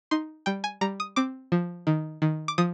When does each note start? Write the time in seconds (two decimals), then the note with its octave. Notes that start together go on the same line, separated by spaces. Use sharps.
0.11 D#4 C6
0.46 G3 G5
0.64 G#5
0.81 G3 A#5
1.00 D#6
1.16 C4 D6
1.52 F3
1.87 D#3
2.22 D#3
2.48 D6
2.58 F3 D#6